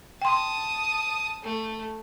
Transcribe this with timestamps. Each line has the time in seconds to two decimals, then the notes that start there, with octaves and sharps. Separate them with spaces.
0.22 G5 A5 C6 D#6
1.43 A3